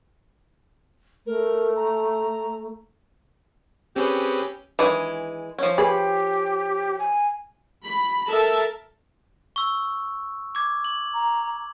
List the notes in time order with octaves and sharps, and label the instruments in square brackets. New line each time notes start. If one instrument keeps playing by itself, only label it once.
[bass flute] A3 [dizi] A#4
[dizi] A#5
[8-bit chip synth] C4 G#4 B4 [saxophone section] C#4 G4
[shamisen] D#3 D4 B4 [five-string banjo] E3 G#3
[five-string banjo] F3 C#4
[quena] G4 [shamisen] G#4 B4
[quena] G#5
[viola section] B5
A4 A#4 E5 A5
[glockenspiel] C#6 E6
D6 G#6
F#7
[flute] A#5